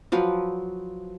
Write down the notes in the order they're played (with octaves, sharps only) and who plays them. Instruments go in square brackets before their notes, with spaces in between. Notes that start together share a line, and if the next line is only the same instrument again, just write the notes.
[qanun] F3 F#3 B4